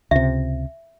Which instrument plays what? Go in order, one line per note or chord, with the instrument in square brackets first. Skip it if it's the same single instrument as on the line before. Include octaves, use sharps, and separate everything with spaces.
[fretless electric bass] C#2 C3 [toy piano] E5